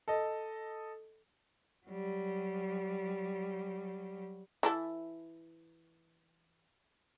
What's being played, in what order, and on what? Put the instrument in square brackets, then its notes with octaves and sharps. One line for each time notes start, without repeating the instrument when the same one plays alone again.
[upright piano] A4 D#5
[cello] F#3 G3
[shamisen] E3 E4 A4